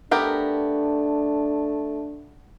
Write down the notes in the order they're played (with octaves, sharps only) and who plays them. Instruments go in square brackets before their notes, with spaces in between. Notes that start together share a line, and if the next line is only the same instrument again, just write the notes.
[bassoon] A3 [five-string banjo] B3 G4 A#4 [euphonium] D4